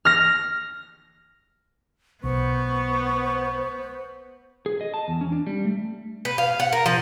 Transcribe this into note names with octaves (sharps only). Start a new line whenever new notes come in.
F6 A#6
B1 B3 C5 C#6
G#4
D#5
A5
E2
C#4
D4
G3
A3
B4
F5
F#5
A#4
F3